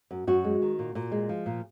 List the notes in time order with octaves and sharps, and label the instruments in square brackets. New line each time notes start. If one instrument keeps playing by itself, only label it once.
[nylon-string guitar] F#2
F#2 F#4
G#3
D#3
A#2
A#2
G#3
F3
A#2